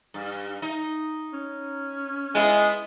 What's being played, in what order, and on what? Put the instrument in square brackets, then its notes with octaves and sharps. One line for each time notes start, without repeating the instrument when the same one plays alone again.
[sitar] G2
D#4
[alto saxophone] C#4
[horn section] G#3 [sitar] B3 E4